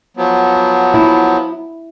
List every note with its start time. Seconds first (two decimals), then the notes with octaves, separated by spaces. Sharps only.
0.17 F3 F#3 B3
0.94 E4